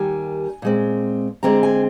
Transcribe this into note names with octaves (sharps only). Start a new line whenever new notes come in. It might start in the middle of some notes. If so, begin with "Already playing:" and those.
Already playing: D#2 D#3 G3 G#5
A#2 G#3 C4
D2 D3 G#3 C4 A#5
G#5